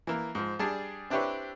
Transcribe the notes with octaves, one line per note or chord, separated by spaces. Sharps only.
E3 A#3
G#2 F3
G3 D4 G#4 A5
C4 D4 E4 G4 B4 C#5